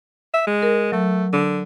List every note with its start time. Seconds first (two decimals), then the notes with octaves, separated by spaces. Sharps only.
0.34 E5
0.47 G#3
0.62 A#4
0.92 F#3 A3
1.33 D3